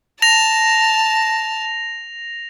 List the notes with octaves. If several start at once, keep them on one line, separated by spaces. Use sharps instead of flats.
A5 A#6 F7